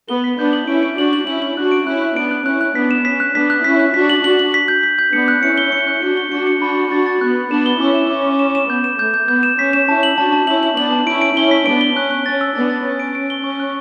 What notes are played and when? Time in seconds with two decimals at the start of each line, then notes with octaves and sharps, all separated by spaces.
0.09 B3 G7
0.24 B6
0.39 B3 D4 G6
0.53 F#7
0.68 C#4 E4 D7
0.83 D7
0.97 D4 F#4 F#7
1.13 F#7
1.27 C#4 E4 F#7
1.42 F#7
1.57 D4 F#4 F#6
1.72 D7
1.87 C#4 E4 F#6
2.02 F#6
2.16 B3 D4 D7
2.31 F#6
2.46 C#4 E4 F#6
2.61 F#6
2.75 B3 D4 B6
2.91 E7
3.05 C#4 B6
3.20 F#6
3.35 B3 D4 B6
3.50 F#6
3.64 C#4 E4 B6
3.79 F#6
3.94 D4 F#4 B6
4.10 F#7
4.24 D4 F#4 F#7
4.39 F#7
4.54 B6
4.68 G6
4.83 B6
4.99 G6
5.13 B3 D4 C#7
5.28 F#6
5.43 C#4 E4 C#7
5.58 G7
5.72 C#7
5.87 F#6
6.02 D4 F#4 C#7
6.17 G7
6.32 D4 F#4 C#7
6.47 C#7
6.61 D4 F#4 B5
6.77 C#7
6.91 D4 F#4 A6
7.06 A6
7.21 B3 F#6
7.35 B5
7.50 B3 D4 E7
7.66 G7
7.80 C#4 E4 D6
7.95 E7
8.10 C#4 D6
8.24 D6
8.39 E7
8.55 E7
8.69 B3 G6
8.84 E7
8.99 A3 G6
9.14 G6
9.28 B3 G6
9.43 E7
9.58 C#4 B6
9.73 E7
9.88 C#4 E4 A5
10.03 F#7
10.17 D4 F#4 A5
10.32 A5
10.47 C#4 E4 F#7
10.63 F#7
10.77 B3 D4 F#7
10.92 A5
11.07 C#4 E4 D7
11.21 D7
11.36 C#4 E4 G7
11.51 B6
11.66 B3 D4 D7
11.81 G7
11.95 C#4 F#6
12.11 F#6
12.26 C#4 A6
12.41 E6
12.55 B3 D4 A6
12.70 A6
12.85 C#4 A6
13.00 D7
13.15 D7
13.30 G7
13.44 C#4 C#6
13.60 F#6